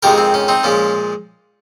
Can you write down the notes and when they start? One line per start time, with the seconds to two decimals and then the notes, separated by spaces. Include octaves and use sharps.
0.03 F2 D#3 G#3 G4 A#4
0.18 C4
0.34 C#4
0.48 C4 D#4
0.64 A#2 F3 G#3 C#4